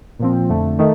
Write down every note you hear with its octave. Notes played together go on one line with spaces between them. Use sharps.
A#2 F3 C4
F2 D3 A3
D#3 A3 D#4